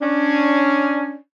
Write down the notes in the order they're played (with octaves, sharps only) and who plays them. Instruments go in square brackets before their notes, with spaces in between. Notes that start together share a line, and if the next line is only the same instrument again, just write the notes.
[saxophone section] C#4 D4